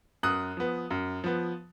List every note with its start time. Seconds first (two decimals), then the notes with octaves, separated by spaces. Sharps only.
0.23 F#2 D#6 F#6
0.57 F3 B3
0.91 F#2
1.24 F3 B3